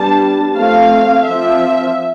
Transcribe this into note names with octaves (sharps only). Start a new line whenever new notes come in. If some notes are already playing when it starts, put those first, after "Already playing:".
Already playing: G3 B3 D4 A5
F3 A3 C4 F5
F3 C4 E5